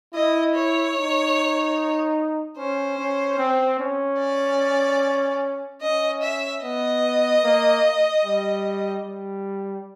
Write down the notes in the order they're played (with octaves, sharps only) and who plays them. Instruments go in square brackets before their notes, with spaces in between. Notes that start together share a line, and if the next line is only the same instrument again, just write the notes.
[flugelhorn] E4 [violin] D#5
[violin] C#5
[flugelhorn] D#4
[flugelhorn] C#4 [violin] C5
[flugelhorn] C#4
C4
C#4
[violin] D5
[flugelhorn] C#4 [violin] D#5
[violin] E5
[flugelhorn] B3 [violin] D#5
[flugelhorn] A#3
G3
G3